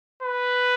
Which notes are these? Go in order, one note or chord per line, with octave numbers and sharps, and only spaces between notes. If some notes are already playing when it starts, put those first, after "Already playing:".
B4